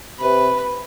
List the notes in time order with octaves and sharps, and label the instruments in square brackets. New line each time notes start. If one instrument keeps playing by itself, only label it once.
[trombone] C3 [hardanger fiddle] B4